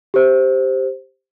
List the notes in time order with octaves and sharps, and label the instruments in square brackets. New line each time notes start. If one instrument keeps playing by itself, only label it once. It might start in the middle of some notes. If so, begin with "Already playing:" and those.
[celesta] G4 C5